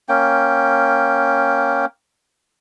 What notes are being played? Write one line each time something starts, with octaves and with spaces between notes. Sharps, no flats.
A#3 C#4 G5